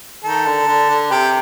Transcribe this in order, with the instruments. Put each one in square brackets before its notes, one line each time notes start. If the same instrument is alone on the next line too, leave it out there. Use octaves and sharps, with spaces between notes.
[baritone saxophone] D#3 [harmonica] A4
[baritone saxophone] D3
D3
D3
[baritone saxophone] C3 [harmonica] G4